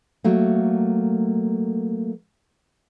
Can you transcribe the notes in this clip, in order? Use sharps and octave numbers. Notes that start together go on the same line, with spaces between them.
F#3 A3 A#3